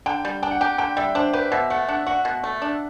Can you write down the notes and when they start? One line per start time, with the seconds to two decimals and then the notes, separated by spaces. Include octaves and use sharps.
0.06 D3 G5
0.25 G3
0.43 D4 G5
0.51 F#5
0.61 G4 G5
0.78 D3 G5
0.97 G3 E5
1.15 D4 C5
1.33 G4 B4
1.52 B2 E5
1.70 A3 F#5
1.88 D4 F#5
2.06 F#4 F#5
2.25 B2
2.44 A3
2.62 D4